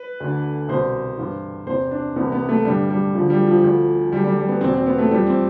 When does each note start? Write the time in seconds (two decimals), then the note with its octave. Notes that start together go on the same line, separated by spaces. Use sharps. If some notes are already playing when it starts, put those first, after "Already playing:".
Already playing: B4
0.20 D2 D3
0.68 C2 B2 C5
1.17 G2 E3
1.66 E2 C3 E3 C5
1.91 D4
2.16 C2 C3 E3 B3
2.32 B3
2.49 A3
2.65 G2 D3 G3
2.90 G3
3.15 D2 D3 F3
3.30 G3
3.47 F3
3.63 D2 D3
4.12 D2 D3 G3
4.24 G3
4.37 G3
4.49 B3
4.61 E2 B2 C4
4.74 C4
4.86 B3
4.98 A3
5.10 F2 E3 G3
5.27 C4